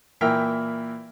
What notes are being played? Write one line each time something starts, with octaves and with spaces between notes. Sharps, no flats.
A#2 E3 A#4 E5 G5 F6